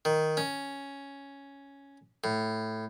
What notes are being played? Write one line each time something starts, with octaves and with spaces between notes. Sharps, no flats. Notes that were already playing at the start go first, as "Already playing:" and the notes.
D#3
C#4
A2